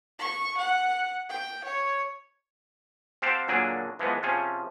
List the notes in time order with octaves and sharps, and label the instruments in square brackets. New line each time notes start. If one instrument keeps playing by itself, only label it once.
[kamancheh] C#6
F#5
G5
C#5
[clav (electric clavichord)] C4 G4 C5 F5 F#5 A5
A#2 D3 F#3 A#3 D4 G#4
E3 F3 G#3 B3
C3 F3 C#4 G#4